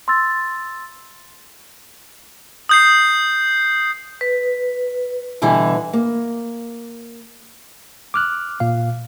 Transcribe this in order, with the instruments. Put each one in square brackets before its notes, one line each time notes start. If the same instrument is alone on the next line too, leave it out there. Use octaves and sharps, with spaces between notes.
[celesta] C6 E6 A6
[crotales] D#6 G6 C7
[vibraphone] B4
[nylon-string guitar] B2 D3 E3 G3 E4
A#3
[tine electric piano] D6 F6 F#6
A#2 F5